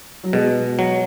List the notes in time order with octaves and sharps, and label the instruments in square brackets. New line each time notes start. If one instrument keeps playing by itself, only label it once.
[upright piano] F#3
[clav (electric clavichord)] B2 [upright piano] G#3
[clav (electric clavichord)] F#3